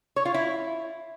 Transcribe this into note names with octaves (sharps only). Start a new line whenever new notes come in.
C#5
F4
E4